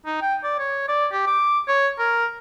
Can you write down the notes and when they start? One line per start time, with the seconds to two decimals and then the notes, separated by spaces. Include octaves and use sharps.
0.06 D#4
0.21 G5
0.43 D5
0.59 C#5
0.88 D5
1.12 G4
1.27 D6
1.68 C#5
1.99 A#4